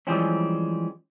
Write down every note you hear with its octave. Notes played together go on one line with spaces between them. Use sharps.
E3 F3 G3 G#3 C4 C#4